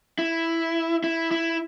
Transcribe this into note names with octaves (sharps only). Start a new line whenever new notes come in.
E4
E4
E4